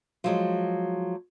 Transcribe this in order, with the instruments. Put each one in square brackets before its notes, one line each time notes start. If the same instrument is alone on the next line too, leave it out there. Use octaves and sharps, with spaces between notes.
[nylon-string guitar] F3 F#3 G#3